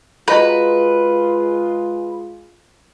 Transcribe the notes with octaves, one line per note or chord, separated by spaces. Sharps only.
G#3 F4 F#4 B4 D#5 A#5